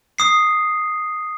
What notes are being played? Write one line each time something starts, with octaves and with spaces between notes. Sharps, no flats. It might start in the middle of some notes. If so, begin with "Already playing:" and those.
D#6 C7